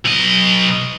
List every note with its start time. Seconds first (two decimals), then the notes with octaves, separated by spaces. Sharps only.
0.05 B1 D#5